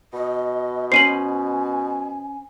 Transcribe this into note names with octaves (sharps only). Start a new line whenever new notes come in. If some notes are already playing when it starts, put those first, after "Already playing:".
B2 D#5
C#4 C5 G#5 C7 D#7 F#7